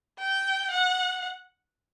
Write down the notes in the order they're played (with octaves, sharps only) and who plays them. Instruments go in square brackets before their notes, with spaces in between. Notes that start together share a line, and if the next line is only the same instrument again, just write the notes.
[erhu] G5
F#5